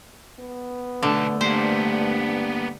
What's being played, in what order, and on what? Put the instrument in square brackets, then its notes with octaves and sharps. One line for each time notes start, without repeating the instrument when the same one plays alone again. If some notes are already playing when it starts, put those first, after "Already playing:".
[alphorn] B3
[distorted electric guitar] B1 A5 [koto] D3 [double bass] A3
[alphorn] G2 [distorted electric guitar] A#3 B3 [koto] C5